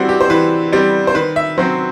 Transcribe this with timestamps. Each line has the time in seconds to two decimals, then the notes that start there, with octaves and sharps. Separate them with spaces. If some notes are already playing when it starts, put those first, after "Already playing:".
Already playing: E3 G3 C4 E4 F#4
0.09 G4
0.21 C5
0.30 E3 B4
0.73 G3 C4
1.07 C5
1.15 D#3 B4
1.36 E5
1.58 F#3 C4 C5